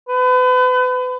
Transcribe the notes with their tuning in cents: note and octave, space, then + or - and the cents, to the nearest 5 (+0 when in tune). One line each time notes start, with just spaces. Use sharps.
B4 +35